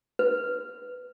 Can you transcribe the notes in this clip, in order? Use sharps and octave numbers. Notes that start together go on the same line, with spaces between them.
B4